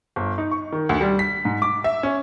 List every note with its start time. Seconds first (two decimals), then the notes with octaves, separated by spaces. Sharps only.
0.16 G1
0.38 D#4
0.51 C#6
0.72 D#3
0.89 D2
1.01 G3
1.19 B6
1.45 G#2
1.62 D6
1.84 E5
2.03 C#4